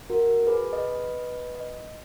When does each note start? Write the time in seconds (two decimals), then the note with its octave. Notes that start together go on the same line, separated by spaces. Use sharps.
0.10 F#4 A#4
0.47 G#4 B4
0.72 B4 D#5
1.55 D#5